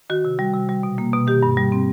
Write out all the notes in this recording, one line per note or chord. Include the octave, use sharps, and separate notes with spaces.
D#3 F#4
C3
G3
C3
G3
B2
A#3
B2
D#3 G4
G2
G3
C4